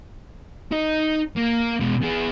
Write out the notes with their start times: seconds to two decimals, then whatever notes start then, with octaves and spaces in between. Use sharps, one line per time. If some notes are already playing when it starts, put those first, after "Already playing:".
0.72 D#4 D#5
1.37 A#3
1.80 B2 G#3
2.02 B3 G#4